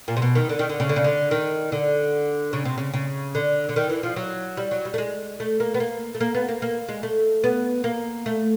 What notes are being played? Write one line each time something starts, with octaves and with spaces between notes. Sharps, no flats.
A#2
C3
B2
D#3
D3
D#3
D3
C#3
D3
C#3
D3
D#3
D3
C#3
C3
C#3
C#3
D3
D3
D#3
E3
F3
F#3
G3
F#3
G3
A3
G#3
A3
A#3
B3
A#3
A3
A#3
B3
A#3
A#3
G#3
A3
B3
A#3
A3